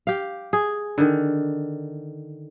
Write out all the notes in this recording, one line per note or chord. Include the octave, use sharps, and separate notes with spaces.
G4 F5
G#4
D3 D#3